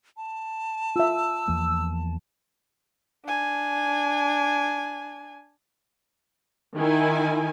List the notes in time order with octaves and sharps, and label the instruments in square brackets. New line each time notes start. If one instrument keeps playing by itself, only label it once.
[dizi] A5
[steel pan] F4 E5 [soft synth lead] E6
[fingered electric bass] E2 F3 A#3
[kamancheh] D4 G#5
[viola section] D#3 E4 G#5